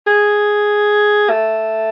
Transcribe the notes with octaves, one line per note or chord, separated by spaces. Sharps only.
G#4
A3